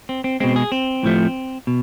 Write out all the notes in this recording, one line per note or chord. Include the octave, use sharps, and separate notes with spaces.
C4
C4
B2 G#3 C4
G#4
C4
A2 F3 A3
B2